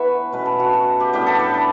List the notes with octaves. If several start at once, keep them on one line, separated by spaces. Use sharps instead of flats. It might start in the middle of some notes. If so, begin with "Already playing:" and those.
Already playing: E3 A3 B3 B4 C#5 E5
B2 A3 C#4 B4
A4
F#4
F#4
G4
A2 G3 B3 D4 G4
A4
B4
A4